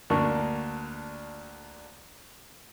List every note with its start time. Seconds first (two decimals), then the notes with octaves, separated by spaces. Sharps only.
0.10 D2 A#3 D4 C#6